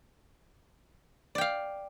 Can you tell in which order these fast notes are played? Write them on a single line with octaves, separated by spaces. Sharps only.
D5 G5 F5